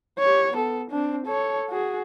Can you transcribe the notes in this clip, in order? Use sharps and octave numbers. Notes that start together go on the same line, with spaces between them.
G4 C#5
B3 A4
C4 D4
A4 C#5
F#4 G#4